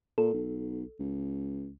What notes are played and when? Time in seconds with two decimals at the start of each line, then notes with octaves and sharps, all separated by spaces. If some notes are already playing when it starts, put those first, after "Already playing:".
0.18 A#2 A4
0.33 B1
1.00 C#2